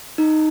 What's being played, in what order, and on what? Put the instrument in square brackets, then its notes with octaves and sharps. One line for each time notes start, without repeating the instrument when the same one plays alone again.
[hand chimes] D#4